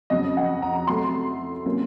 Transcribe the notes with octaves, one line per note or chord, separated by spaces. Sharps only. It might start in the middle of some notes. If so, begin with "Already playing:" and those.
F2 C#3 F#3 D#5
F#5
A#5
C3 F#3 A3 C6
C3 F#3 A#3 C#4